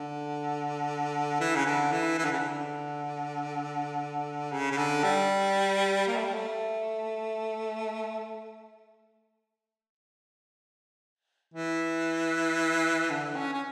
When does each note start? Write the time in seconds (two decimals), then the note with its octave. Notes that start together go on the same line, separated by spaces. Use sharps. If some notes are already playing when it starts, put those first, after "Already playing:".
Already playing: D3
1.40 E3
1.56 C#3
1.65 D3
1.92 E3
2.18 E3
2.25 D3
2.32 C#3
2.39 D3
4.52 C#3
4.72 C#3
4.77 D3
5.04 G3
6.08 A#3
6.16 A3
6.25 G3
6.34 A3
11.54 E3
13.10 D3
13.36 C#4
13.54 C#4